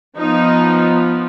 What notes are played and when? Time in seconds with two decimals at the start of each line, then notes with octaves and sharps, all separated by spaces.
0.17 F3 B3 D#4